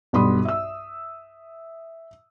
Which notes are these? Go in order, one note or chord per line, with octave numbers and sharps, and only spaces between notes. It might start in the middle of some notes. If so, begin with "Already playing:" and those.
B1 G2 B5 C6 D#6
E5 E6